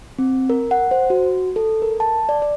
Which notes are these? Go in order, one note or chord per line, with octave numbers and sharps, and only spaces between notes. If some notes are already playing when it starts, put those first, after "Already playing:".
C4
A#4
F#5
C5
F#4
A4
A#4
A5
D5
D5